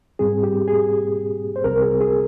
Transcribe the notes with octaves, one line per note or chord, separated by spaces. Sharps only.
G#2 G3 C4 G#4
G4
G#4
C5
C2 C3 G3 C4 A#4
G#4
G#4